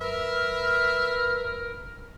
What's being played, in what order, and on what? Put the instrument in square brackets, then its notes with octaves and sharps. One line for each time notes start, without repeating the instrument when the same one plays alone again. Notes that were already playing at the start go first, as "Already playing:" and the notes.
[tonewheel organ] F#2 B4 B5 [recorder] A#4 [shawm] E5 [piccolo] F6